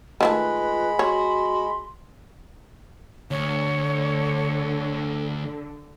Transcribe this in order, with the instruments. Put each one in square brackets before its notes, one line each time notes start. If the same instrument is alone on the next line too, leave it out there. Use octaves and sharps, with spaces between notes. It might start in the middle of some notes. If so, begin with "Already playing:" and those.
[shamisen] D#3 F3 A3 [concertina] G#3 B5 [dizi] F4 [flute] B4
[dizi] F#4 [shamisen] C#5 [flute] C6
[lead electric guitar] D2 [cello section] D3 [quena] C#5